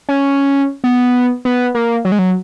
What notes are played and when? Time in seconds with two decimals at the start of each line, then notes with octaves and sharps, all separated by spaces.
0.09 C#4
0.84 B3
1.45 B3
1.75 A#3
2.05 F#3
2.12 G#3
2.19 F#3